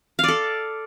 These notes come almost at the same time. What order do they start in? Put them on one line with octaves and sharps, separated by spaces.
F5 D5 A4